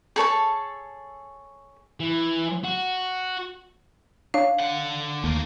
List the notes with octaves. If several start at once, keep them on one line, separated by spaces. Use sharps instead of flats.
G#4 A4 C#5 A5
E3
F#4
D4 C#5 F5
D3 F#5
D#2 A3 A#3